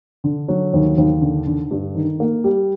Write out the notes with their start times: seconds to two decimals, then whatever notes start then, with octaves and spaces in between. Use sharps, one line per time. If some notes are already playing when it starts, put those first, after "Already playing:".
0.24 D3
0.48 F#3
0.73 D#2
0.98 D#2
1.22 D3
1.47 D3
1.71 G2
1.95 D#3
2.20 A#3
2.44 G3